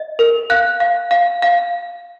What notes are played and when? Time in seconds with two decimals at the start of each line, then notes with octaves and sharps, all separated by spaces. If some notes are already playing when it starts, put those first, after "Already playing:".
Already playing: D#5
0.19 A#4
0.50 F5 F#6
0.80 F5
1.11 F5
1.42 F5